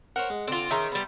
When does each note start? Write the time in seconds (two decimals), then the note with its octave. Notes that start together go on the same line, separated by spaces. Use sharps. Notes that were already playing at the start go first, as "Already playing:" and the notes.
0.16 A#4 C5 C#5 F#5
0.30 G#3
0.48 D3 C4 F4
0.71 D#3 C#4 G#4 E5 A#5 C6
0.92 G3 B3